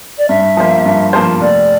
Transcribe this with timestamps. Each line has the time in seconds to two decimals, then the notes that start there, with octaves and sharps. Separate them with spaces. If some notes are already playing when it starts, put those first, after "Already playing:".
0.18 D5
0.29 G2 E5
0.57 F3 A#3 F4 C5
0.85 G2
1.13 F3 A#3 F4 C5
1.40 F1 D5